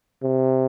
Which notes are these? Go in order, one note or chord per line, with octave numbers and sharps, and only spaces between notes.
C3